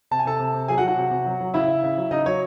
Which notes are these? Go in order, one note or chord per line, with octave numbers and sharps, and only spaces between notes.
C3 A5
G#5
C3 A4 A5
C3
C3
F#3 G#4 G#5
F#4 F#5
F#3
F#4 F#5
C3
C3
F#3
F#3
C#3 E4 E5
C#3
C#3
F#3
C#3 D#4 D#5
F#3 C#5